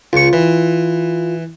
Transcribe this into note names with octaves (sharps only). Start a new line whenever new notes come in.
C#2 F4 C#6
E3